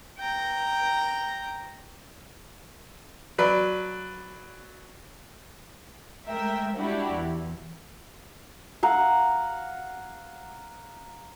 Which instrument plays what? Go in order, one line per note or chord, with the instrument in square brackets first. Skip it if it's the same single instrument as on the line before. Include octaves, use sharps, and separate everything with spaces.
[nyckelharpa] G5 A#5
[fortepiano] F#3 B4 D5
[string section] G#3 A3 A#4 E5 G5
G3 G#3 D4 E4 F#4 G4
E2 E3
[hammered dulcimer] F5 F#5 A#5